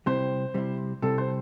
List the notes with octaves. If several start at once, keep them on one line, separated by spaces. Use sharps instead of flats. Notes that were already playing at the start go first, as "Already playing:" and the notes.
C3 G3 C4 E4 C5
C3 G3 C4 E4
C3 G3 C4 E4 A4
C5